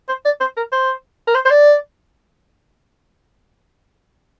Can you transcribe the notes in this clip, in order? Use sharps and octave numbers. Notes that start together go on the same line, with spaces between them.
C5
D5
C5
A#4
C5
A#4
C5
C5
D5